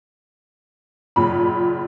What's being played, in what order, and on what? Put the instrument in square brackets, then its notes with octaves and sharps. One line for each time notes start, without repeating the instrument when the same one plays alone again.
[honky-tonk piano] F#1 A#2 B5